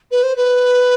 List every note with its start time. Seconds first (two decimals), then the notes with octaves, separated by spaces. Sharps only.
0.11 B4
0.23 C5
0.36 B4